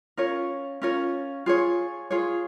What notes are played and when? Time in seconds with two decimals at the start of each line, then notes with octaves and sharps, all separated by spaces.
0.17 C#4 F4 A#4 C#5
0.82 C#4 F4 A#4 C#5
1.46 F4 G#4 C#5
2.11 F4 G#4 C#5